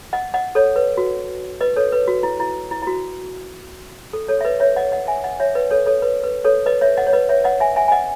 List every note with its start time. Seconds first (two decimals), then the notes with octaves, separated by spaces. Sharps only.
0.13 D#5 F#5
0.34 D#5 F#5
0.55 A4 C#5
0.76 B4
0.97 F#4
1.61 B4 D#5
1.76 A4 C#5
1.92 B4
2.08 F#4
2.23 E4
2.40 E4
2.71 E4
2.82 E4
2.87 F#4
4.13 A4
4.28 A4 C#5
4.41 E5
4.45 B4 D#5
4.60 C#5 E5
4.76 D#5 F#5
4.92 D#5 F#5
5.07 E5 G#5
5.24 D#5 F#5
5.40 C#5 E5
5.55 B4 D#5
5.71 A4 C#5
5.86 A4 C#5
6.02 B4
6.24 B4
6.45 A4 C#5
6.66 B4 D#5
6.81 C#5 E5
6.97 D#5 F#5
7.07 C#5
7.13 B4 D#5
7.29 C#5 E5
7.44 D#5 F#5
7.60 E5 G#5
7.76 E5 G#5
7.88 G#5
7.92 D#5 F#5